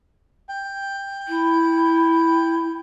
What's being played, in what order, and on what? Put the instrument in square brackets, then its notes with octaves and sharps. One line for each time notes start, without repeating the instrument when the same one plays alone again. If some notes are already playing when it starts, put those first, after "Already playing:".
[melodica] G5
[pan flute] E4